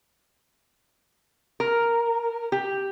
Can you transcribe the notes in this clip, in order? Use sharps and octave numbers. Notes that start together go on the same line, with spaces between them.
A#4
G4